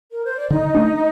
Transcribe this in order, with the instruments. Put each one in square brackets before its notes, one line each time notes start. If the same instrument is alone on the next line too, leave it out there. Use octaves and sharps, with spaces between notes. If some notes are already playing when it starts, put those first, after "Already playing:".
[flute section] A#4
C5
D5
[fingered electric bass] D3 [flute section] D#4 D#5
[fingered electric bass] A3 D4